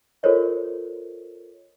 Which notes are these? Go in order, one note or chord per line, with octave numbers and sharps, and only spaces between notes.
F4 A4 A#4 C5 C#5 D#5